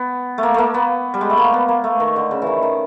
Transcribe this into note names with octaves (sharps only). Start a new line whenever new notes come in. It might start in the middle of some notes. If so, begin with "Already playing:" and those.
Already playing: B3
A3
A#3
A3 A#3
B3
G3
G#3
A3
A#3
B3
A#3
A3
D#3
D3
C#3
D#3 E3
D#3